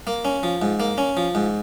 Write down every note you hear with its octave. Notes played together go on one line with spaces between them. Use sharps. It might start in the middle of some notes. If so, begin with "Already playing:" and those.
A#3
C#4
F3
G#2
A#3
C#4
F3
G#2